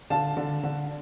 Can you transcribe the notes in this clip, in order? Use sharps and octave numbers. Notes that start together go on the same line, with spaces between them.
D3 F5 A5
D3
D3